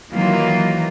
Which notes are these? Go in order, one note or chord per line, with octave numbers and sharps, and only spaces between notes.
D#3 E3 F#3 A#3 F4